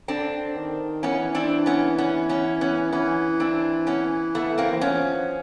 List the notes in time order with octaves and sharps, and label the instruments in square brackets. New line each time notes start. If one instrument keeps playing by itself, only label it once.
[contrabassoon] D3 [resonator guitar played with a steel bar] C4 D4
[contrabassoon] D#3
[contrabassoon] E3 [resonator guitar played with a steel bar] B3 C#4
[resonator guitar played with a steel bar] C4 D4
B3 C#4
B3 C#4
B3 C#4
B3 C#4
[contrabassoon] E3 [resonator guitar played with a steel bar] B3 C#4
[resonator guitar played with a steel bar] C4 D4
B3 C#4
A3 B3
A#3 C4
[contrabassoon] E3
[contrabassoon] F3 [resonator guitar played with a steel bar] B3 C#4